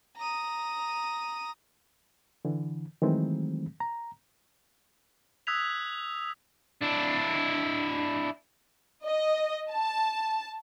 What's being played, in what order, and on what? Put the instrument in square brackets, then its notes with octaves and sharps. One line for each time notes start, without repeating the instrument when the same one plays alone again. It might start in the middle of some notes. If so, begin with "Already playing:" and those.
[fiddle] A#5 D#6
[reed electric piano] D3 E3
D#3 E3 F#3 G#3 A3 C4
A#5
[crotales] D#6 E6 F#6 G#6 B6 F7
[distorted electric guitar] D4 E4
[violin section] D#5
A5